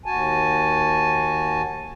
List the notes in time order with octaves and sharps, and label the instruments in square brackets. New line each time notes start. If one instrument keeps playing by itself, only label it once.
[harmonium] D#2 F#4 G#5 A5